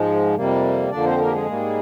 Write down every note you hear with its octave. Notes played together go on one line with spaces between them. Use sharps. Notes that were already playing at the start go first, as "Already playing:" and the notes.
Already playing: G#2 F3 G#3
F2 C3 G3 A#3
F2 D3 F3 A#3 D4 D5
C4 C5
A#3 A#4
G4
G#3 G#4
G#2 G3 A#3